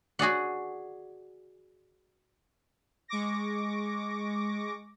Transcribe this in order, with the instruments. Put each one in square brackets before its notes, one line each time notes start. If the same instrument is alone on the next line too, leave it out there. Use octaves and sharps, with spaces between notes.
[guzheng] F#4 G#4 D5 F#5
[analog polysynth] G#3 C#6 D6 A#6